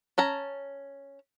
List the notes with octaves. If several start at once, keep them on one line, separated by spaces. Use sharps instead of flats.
C#4 A5 A#5